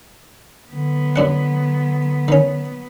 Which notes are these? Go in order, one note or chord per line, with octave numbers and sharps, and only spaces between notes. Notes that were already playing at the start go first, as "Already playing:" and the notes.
D3 F#3 B3
F#2 D4 F#5
D#3 C#4